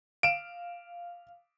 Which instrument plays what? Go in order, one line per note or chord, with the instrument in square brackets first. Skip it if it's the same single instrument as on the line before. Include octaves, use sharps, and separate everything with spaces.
[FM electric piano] F5 [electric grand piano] D7 E7